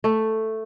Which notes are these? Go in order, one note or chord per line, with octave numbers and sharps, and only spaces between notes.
A3